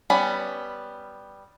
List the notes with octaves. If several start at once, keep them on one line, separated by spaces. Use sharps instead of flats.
G3 B3 C#4 B5